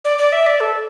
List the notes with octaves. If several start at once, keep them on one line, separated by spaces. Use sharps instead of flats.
D5
D5
E5
D5
A4